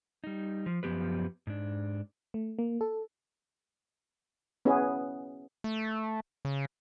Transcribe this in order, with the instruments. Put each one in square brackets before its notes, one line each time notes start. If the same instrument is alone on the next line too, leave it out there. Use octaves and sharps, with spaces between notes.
[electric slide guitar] G3 D#4
F3
F#2 F3 B3 G4 B4
G#2 D4
[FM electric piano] A3
A#3
A4
[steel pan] B3 C#4 E4 G#4 B4
[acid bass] A3
C#3